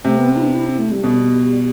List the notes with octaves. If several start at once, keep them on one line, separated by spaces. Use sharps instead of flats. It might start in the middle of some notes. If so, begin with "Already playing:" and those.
C3 A3
B3
C4
E4
D4
E4
C4
A3
G3
B2